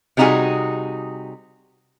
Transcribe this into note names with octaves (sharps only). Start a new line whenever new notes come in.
C3 G3 D#4 F4 F#4 G#4